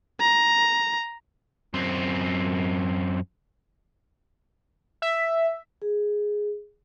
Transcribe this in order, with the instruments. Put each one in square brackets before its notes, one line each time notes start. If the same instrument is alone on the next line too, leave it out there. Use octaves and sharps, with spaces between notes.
[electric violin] A#5
[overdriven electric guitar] F#2 C4
[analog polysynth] E5
[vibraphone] G#4